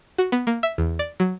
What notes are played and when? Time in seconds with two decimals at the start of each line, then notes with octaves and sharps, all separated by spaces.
0.18 F#4
0.32 B3
0.47 A#3
0.63 E5
0.78 E2
0.99 D5
1.20 F#3